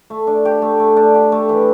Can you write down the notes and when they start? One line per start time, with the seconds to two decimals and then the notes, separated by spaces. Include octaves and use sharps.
0.10 A3
0.27 D4
0.45 G4
0.62 A3
0.80 A3
0.96 D4
1.14 G4
1.32 A3
1.49 E3